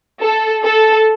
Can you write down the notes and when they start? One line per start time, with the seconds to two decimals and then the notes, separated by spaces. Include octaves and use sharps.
0.21 A4
0.65 A4